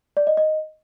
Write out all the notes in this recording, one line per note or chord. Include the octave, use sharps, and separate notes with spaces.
D5
D#5
D#5